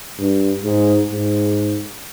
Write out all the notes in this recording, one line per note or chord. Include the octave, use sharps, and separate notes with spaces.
G2
G#2
G#2